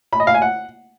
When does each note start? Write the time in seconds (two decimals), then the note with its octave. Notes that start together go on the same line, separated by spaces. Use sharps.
0.13 B5
0.20 D#5
0.27 F5
0.34 G#5
0.42 F#5